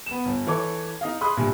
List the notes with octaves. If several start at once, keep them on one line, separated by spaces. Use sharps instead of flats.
B3 E7
G1
E3 A4 C#5 D6
D#4 D#5 F5
G#4 B5 C6 D#6 F#6
C2 G2 A#2 G#5